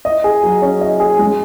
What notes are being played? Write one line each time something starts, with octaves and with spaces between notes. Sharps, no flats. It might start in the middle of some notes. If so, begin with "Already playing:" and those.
D#5
G#4
F#3
C#4
D#5
G#4
G#3